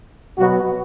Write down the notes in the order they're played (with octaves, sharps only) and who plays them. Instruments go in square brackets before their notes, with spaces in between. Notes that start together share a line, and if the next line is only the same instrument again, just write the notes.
[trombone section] B2 F#3 B3 F#4